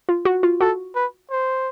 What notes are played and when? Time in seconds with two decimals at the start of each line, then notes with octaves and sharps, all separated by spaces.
0.09 F4
0.25 F#4
0.43 F4
0.61 F#4 A4
0.95 B4
1.31 C5